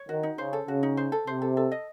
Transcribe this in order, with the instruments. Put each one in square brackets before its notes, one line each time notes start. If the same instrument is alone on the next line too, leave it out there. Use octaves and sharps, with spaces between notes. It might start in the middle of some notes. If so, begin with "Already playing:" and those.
Already playing: [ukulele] C#5
[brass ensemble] D#3 [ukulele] F#4
[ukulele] D#4
[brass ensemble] C#3 [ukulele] C5
[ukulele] A4
[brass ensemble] C#3 [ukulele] F#4
[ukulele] D#4
C5
A4
[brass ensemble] C3 [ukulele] C5
[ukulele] A4
A4
D#5